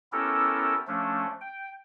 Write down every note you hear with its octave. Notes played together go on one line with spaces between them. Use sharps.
B3 C#4 E4 G4 A4 A#4
F3 A3 C#4 D4
G5